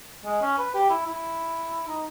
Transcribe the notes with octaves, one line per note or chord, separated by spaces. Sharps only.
G#3
C#4
B4
G4
E4
E4
D#4